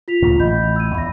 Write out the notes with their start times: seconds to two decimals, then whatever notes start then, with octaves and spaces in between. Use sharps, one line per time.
0.08 F4 B6 F7
0.22 D2 A#2 C#3
0.40 A1 D#5 B5 G6
0.76 E6 G#6 D#7
0.95 E2 B5 A#6